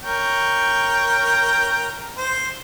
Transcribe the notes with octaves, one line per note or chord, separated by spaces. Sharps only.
A#4 C#5 G5
C5